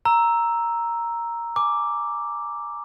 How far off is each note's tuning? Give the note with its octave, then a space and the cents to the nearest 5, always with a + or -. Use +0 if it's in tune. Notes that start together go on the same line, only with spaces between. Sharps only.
A#5 +0 E6 +0
G#5 +15 D6 +0